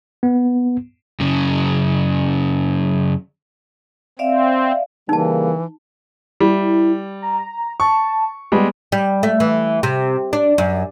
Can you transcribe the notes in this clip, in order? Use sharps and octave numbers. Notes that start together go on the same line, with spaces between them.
B3
F#2 C#3
C4 D5 E5 F5
C#3 E3 G3 A#3 D#4 A5
G3 E4
A#5
A5 C#6
G3 G#3 B3
G3
A3
E3
C3
D4
F#2